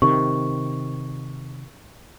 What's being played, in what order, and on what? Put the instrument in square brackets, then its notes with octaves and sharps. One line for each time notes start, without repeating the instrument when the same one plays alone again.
[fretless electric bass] C3 D#3 [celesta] C#6